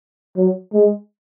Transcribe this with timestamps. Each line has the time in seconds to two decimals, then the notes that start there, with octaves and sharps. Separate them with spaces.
0.37 F#3
0.73 G#3